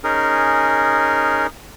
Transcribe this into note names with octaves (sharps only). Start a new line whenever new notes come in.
C#4 D#4 G#4 A#4